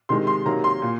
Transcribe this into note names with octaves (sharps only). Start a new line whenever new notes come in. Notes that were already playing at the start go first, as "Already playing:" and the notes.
C3 D#3 G#3 C6
C6
C3 D#3 F#3 A#3 A#5
C6
A#2